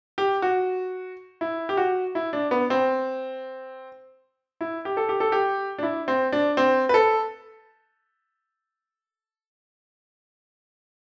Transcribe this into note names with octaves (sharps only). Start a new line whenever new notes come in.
G4
F#4
E4
G4
F#4
E4
D4
B3
C4
E4
G4
A4
G4
A4
G4
D4
E4
C4
D4
C4
B4
A4